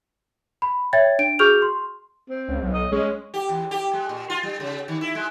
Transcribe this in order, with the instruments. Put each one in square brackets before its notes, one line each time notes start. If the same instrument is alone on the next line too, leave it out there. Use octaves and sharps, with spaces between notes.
[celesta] B5
C#5 E5 G5 G#6 A6
D4 D7
F#4 G#4 C#6 F6 G6 F7
C6
[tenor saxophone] C4
[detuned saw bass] C#2
B1
[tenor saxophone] D#5
[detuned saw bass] G#3 [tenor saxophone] C#4
[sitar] G4
E2
G4
G#3
A#2
F4
G3
C#3
D#3
E4
G#3